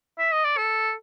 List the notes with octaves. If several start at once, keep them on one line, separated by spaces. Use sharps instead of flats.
E5
D#5
D5
A4